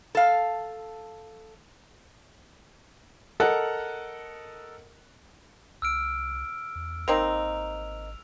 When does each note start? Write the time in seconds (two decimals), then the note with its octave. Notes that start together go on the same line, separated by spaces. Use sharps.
0.15 A4 F5
3.40 A4 A#4 D#5 F#5 F#6
5.82 C2 E6 F6 D7
6.75 E2
7.08 G#1 A#3 C4 D#4 F7